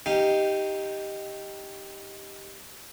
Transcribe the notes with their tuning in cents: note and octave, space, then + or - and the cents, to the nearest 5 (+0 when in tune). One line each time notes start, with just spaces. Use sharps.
D#4 +0 G4 +0 F5 -15